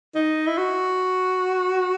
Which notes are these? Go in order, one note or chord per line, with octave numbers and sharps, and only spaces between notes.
D#4
E4
F#4